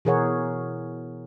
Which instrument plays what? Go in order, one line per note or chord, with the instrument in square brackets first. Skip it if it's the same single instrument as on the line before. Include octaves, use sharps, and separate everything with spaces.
[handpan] B2 E3 G#4 A#4 C#5 F#5